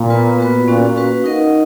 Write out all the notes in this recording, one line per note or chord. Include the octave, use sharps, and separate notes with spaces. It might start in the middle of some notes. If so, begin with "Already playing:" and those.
Already playing: A#2
B3 F4 B4
B3 F#4 B4
A#2 A#3 C#4 F#4
C#4 F#4 B4 F5
D#4 A#4 D#5 F#5